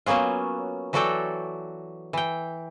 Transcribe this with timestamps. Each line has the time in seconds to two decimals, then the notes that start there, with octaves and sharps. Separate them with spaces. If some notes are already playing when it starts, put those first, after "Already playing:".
0.06 F#3 A#3 B3 C#4 F4
0.93 E3 F#3 F#4 A4 D5 G5
2.13 E3 G5